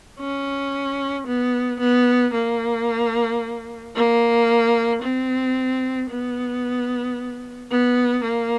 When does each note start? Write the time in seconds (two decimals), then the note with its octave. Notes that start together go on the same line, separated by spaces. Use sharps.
0.20 C#4
1.27 B3
1.80 B3
2.34 A#3
3.95 A#3
5.02 C4
6.10 B3
7.71 B3
8.24 A#3